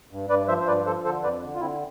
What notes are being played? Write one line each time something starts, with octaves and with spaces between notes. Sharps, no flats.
G2
G2 B4 D5
F3 C5 E5
C5
G2 B4 D5
F3 A4 C5
D3 A4 C5
F2 B4 D5
D3
F4
D3 C4 E4